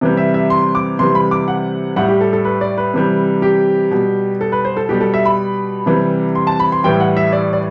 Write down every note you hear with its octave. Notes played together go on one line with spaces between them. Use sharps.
C3 E3 G3
E5
E5
C6
D6
C3 E3 G3 C6
B5
D6
F#5
A2 G3 F#5
G4
A4
A4
B4
D5
B4
C3 E3 G3
G4
B2 G3
A4
B4
C5
A4
B2 G3 G4
A4
E5
B5
C3 E3 G3
C6
A5
B5
C6
A2 E3 G3 G5
F#5
E5
D5
D5